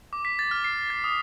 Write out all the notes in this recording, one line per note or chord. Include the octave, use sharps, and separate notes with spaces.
D6
B6
A6
F6
C7
A6
D#6